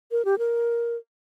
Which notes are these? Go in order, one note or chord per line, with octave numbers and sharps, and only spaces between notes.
A#4
G4
A#4